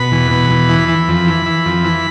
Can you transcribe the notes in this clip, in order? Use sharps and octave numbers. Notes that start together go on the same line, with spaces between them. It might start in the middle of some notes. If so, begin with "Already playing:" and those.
Already playing: B2 B5
E2
B2
E2
E3
E3
F2
E3
E3
F2
E3